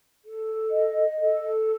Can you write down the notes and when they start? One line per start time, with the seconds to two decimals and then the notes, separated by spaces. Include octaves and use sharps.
0.24 A4
0.70 D#5
1.17 A4